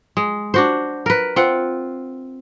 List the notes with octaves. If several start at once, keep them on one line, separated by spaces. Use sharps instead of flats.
G#3
D4 F#4 C5
A#4 B4
C4 F4 F#5